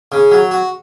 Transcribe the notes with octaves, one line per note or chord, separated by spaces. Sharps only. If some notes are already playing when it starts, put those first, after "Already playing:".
C#3
F#3
F#4